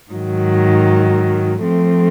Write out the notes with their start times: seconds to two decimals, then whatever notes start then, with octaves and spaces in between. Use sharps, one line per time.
0.11 G#2 D#3 F#3
1.62 F3 A3 C4